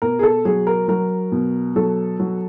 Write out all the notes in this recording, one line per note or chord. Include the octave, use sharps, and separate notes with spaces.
B2 A#4
G#4
A4
F#3 G#4
A#4
F#3 A#4
B2
F#3 A4
F#3